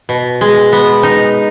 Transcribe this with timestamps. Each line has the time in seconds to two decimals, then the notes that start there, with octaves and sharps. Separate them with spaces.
0.09 B2
0.41 G#3
0.72 B3
1.03 D#4